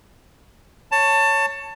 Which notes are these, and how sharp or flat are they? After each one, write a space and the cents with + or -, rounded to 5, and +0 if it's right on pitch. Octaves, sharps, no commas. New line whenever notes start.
C#5 +0 A5 +20